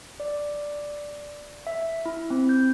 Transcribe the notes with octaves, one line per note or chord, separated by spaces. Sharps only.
D5
E5
E4
C4
G6